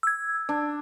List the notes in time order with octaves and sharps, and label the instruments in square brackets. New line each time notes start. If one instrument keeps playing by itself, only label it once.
[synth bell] E6 G#6
[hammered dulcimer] D4